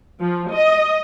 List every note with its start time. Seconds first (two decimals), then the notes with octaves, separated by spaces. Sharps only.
0.21 F3
0.52 D#5